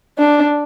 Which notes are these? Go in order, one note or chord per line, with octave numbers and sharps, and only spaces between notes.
D4